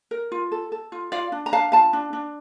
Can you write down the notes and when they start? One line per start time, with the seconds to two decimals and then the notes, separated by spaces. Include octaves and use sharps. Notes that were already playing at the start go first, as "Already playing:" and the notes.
0.11 A#4
0.32 F4
0.52 A4
0.72 A4
0.92 F4
1.12 F4 D5 F5
1.32 D4
1.46 A#5
1.52 D4 F5 A5
1.72 F4 F5 A5
1.93 D4
2.13 D4